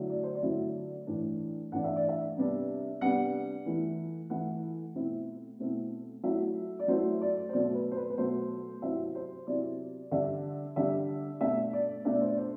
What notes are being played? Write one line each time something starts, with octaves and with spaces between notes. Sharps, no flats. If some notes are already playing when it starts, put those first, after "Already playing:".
Already playing: D3 F#3 A3 E4
D5
C5
D5
D3 F#3 A3 E4
A2 E3 A3 D4
A2 E3 A3 D4 F#5
E5
D5
E5
C3 G3 B3 D4
C3 G3 B3 D4 F#5
E3 A3 E4
E3 A3 E4 F#5
B2 A3 C4 E4
B2 A3 C4 E4
F#3 A3 E4 E5
D5
F#3 A3 E4 C5
D5
C5
B2 F#3 A3 D5
B4
C5
B4
B4
B2 F#3 A3 C5
C3 F#3 C4 E4 E5
C5
C3 F#3 C4 E4 D5
D3 G3 D4 E5
D3 G3 D4 E5
B2 A3 D4 E5
D5
B2 A3 D4 E5
D5
C5
D5
C5